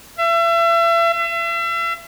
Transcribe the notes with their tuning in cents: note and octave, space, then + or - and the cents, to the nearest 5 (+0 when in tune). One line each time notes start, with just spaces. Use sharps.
E5 +35
E5 +40